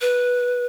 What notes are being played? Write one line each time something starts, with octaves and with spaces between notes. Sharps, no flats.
B4